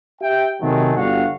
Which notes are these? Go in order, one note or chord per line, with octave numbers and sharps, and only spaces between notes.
G4 E5 G5
C3 D#3 F#3 G#3 A3
G1 G2 F#4 F5 F#5